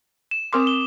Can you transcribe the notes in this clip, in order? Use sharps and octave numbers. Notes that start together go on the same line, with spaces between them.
E7
C4 A#4 C6 D6 D#6
G7